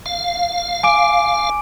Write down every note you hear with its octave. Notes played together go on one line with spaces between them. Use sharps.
F5
G#5 D6 D7